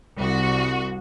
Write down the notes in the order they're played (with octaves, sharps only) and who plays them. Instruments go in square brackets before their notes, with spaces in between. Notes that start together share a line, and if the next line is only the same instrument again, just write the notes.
[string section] C2 F#4